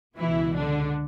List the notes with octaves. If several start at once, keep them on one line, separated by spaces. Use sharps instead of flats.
C#2 B2 E3 E4
D3 D4